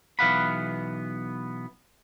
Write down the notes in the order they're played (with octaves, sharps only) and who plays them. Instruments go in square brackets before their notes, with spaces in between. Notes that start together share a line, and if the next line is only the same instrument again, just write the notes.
[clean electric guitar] B1 E3 B3 F5 F#5 B5